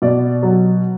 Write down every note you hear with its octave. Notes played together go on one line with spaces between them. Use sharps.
B2 D5
F#3